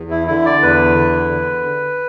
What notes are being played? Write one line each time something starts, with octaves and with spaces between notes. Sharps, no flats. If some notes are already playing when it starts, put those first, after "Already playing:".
Already playing: E2
E4
D3 E4
D5
E2 B4
D3
D3